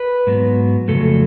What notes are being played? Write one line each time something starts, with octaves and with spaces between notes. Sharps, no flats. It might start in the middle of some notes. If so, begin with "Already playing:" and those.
Already playing: B4
G#2 F#3 B3
F2 C#3 F#3 A3 A4